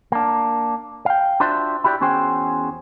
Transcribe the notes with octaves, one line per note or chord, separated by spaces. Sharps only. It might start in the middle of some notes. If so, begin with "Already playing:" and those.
A#3 D4
F5 G5
D4 F4 F#4 C5 D5 E5
E4 F#4 G4 B4 D5
E2 C#4 F#4 G#4 C5 G5